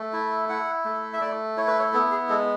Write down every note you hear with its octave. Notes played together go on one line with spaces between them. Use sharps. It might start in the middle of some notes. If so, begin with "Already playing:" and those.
Already playing: A3
E4
E4 F#5
A3
E5
A3 D5
E4 C#5
B4
C#5
B3 A4
G#4
G#3 A4